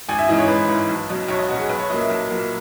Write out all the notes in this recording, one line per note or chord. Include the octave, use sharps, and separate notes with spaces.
G#1 G#5
E5
G#2 E3 D#5
C#5
G#1 B4
G#2 E3
B1
B2 F#3
B1 C#5
D#5
B2 F#3 F#4
G#4
B1 B4
C#5
A#2 F#3 A#3 D#5
E5
B1
A#2 F#3 A#3